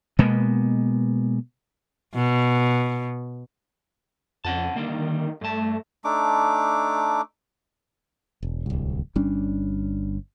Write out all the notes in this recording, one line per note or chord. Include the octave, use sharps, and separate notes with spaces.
B2 G#3 A#3 B3
B2
F2 C#4 F#5 A5
D3 D#3 G3 A#3
G2 A3 A5
A3 D4 D#4 D6
E1
D1 C2
G1 G3 C#4 D4